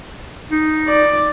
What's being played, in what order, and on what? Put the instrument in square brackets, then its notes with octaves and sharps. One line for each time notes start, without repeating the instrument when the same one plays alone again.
[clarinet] D#4
[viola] D5